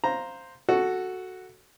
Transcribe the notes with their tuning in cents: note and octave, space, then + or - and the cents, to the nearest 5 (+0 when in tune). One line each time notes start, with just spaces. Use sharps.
C5 +0 F5 +0 A#5 +0
F#4 +0 A4 +0